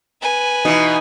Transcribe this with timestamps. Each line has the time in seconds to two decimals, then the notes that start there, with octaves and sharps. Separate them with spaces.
0.21 B4 G#5
0.65 B2 E3 D#4